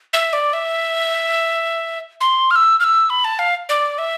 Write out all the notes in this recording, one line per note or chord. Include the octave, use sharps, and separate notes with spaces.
E5
D5
E5
C6
F6
E6
F6
E6
B5
A5
F5
D5
E5